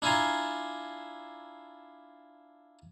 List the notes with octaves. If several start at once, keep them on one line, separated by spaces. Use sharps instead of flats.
D4 E4 F4 G#5 A#5 C6